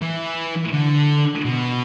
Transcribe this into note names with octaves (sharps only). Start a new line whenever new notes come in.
E3
D3
B2